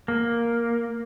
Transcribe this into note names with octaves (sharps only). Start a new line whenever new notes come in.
A#3